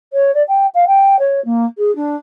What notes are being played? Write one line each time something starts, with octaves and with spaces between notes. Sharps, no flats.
C#5
D5
G5
F5
G5
C#5
A#3
G#4
D4